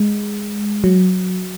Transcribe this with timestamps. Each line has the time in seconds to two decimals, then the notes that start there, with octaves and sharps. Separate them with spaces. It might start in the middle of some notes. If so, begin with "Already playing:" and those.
Already playing: G#3
0.84 F#3